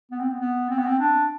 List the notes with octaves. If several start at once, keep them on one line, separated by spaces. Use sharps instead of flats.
B3
C4
B3
B3
C4
B3
C4
D4